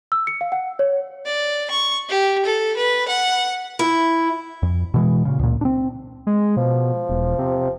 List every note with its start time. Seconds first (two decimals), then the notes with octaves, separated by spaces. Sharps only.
0.12 E6
0.27 C#7
0.41 F5
0.52 F#5
0.79 C#5
1.26 D5
1.70 C#6
2.09 G4
2.45 A4
2.77 B4
3.08 F#5
3.79 E4
4.63 F2
4.94 B2 E3 G#3
5.25 A#2 C#3
5.39 C#2 A#2
5.61 C4 D4
6.27 G#3
6.57 B2 F3
7.09 E1
7.38 C3